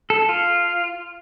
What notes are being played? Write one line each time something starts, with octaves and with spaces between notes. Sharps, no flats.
A4
F4